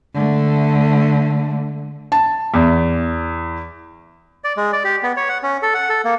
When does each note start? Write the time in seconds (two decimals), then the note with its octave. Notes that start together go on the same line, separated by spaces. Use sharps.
0.14 D3 A3
2.12 A5
2.54 E2
4.44 D5
4.57 G#3
4.73 D5
4.84 G4
5.03 B3
5.17 C#5
5.29 F#5
5.43 C#4
5.62 A4
5.74 F#5
5.89 A4
6.05 A#3